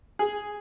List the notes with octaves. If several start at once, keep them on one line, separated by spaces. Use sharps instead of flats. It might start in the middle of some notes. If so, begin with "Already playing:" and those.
G#4